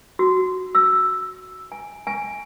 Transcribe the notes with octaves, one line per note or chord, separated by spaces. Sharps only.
F#4
E6
G#5
G#5